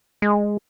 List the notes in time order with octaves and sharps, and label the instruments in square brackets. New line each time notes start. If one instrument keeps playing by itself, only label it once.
[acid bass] G#3